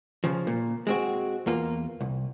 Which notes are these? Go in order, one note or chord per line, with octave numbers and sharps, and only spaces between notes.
C#3 F3
A#2
G#3 C4 F#4
E2 A#3 F4
C2